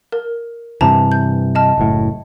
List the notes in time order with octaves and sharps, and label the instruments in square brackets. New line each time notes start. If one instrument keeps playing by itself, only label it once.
[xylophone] A#4
[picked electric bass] G2 C3 E3 [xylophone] A5 A#5
[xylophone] G6
D#5 A5 F6
[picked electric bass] F#1 A2